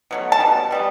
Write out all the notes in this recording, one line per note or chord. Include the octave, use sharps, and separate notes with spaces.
B2 F#3 A3
A5
B2 G3
B2 G3 B3